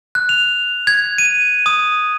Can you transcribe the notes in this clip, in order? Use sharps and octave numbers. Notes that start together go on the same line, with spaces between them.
F#6
F7
G#6
D#7
D#6